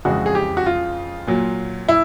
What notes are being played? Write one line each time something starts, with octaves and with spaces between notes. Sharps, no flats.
F2 C#3 E3 G#3 F#4
G#4
G4
F#4
F4
A#2 F#3
E4